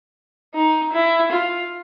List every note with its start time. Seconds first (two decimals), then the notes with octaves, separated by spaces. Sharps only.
0.54 D#4
0.93 E4
1.31 F4